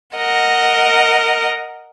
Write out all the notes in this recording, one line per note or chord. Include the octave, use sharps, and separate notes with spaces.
A#4 D#5 F#5